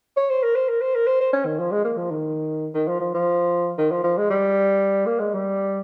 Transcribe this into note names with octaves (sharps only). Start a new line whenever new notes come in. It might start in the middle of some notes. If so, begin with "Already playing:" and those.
C#5
C5
A#4
C5
A#4
C5
A#4
C5
C5
C#4
D#3
F3
G#3
A#3
F3
D#3
D#3
F3
F3
F3
D#3
F3
F3
G#3
G3
A#3
G#3
G3